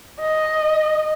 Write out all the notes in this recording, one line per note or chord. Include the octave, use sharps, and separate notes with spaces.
D#5